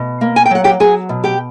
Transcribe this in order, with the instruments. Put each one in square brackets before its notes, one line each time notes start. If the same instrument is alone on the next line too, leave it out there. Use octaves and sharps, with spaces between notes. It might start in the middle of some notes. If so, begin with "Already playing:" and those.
Already playing: [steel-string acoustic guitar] B2
A#3
G#5
G5
F#3 F#5
G4 G5
F#3 G#4 G#5
B2
G4 G5